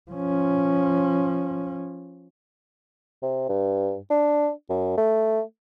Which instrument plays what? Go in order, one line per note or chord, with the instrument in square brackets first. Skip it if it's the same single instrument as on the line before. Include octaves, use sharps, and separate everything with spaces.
[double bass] F3 C#4
[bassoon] C3
G2
D4
F#2
A3